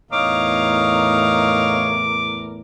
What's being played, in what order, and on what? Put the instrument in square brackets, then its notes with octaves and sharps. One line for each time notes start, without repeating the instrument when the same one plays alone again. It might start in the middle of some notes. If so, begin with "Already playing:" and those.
[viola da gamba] E2 A2 A#4 [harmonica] D#4 C#5 F5 [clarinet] D6